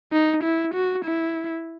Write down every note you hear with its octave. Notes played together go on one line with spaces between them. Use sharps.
D#4
E4
F#4
E4